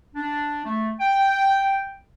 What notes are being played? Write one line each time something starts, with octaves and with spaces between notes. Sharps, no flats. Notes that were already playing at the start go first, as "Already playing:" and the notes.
D4
A3
G5